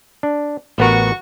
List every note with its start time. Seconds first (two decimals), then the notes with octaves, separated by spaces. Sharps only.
0.23 D4
0.78 A1 B3 F#4 A#4 C#6